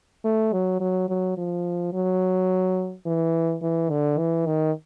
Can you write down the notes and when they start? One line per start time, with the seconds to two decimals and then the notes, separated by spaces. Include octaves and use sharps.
0.24 A3
0.52 F#3
0.80 F#3
1.09 F#3
1.37 F3
1.93 F#3
3.06 E3
3.62 E3
3.90 D3
4.18 E3
4.46 D#3